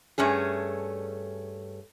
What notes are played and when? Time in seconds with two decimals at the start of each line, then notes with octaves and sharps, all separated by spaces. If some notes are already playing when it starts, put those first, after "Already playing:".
0.18 G2 A3 C#4 G#4